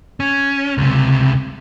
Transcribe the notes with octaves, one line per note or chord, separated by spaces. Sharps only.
C#4
C#2 C3